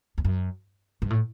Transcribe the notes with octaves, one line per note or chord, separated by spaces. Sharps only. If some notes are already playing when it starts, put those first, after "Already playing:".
E2
F#2
G2
A2